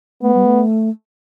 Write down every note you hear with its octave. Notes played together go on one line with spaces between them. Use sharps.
A3 B3
G3
A3